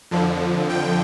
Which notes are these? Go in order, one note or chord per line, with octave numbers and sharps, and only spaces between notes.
F2 D3 F3
G5